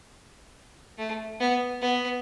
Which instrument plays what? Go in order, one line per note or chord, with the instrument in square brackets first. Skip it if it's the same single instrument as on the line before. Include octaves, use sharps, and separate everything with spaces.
[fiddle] A3
B3
B3